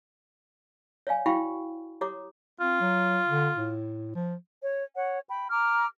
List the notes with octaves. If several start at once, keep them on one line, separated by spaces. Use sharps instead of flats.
C#5 D5 F5 G#5
E4 F#4 F5 G5 B5 C#6
G4 C#5 A#5 D6 D#6
C4 F4
F#3
D3
A2
F3
C#5
C#5 F#5
G5 B5
A#5 D6 F6